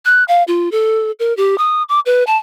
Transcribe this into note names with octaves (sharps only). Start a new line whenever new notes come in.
F#6
F5
F4
A4
A#4
G4
D#6
D6
B4
A5